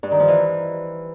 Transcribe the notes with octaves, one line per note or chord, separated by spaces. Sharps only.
G2
D#3
F3
E3